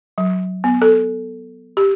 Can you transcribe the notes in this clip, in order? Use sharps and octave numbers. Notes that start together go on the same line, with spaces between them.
F#3
B3
A4
G4